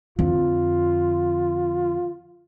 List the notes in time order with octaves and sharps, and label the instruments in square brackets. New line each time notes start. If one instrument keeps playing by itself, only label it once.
[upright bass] F2 D3 [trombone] F4